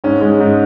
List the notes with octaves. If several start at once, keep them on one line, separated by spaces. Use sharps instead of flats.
G#2 C#4
G#3
G#2